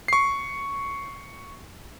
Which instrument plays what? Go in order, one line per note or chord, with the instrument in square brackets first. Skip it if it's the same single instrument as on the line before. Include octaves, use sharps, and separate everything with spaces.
[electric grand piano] C#6 C7